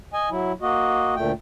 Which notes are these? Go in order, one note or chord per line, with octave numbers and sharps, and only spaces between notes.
D#5 G#5
F#3 E4
A#3 F#4 D#5
D2 A#2 A3 G5